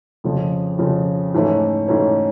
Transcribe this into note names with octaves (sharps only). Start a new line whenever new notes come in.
F2 C#3 F3
F2 C#3 F3
G#2 E3 A3 C#4
G#2 E3 A3 C#4